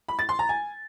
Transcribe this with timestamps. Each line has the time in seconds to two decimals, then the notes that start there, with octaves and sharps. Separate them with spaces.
0.09 B5
0.19 A6
0.29 C6
0.39 A#5
0.49 G#5